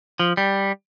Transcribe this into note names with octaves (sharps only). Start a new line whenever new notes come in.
F3
G3